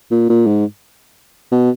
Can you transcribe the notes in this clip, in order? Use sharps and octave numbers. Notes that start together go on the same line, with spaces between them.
A#2
A#2
G#2
B2